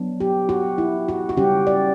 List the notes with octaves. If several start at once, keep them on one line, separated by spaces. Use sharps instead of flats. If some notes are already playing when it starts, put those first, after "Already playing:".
Already playing: F#3 B3 D4
G4
F#4
E4
F#4
F#4
C#3 G3 C#4 G4
D5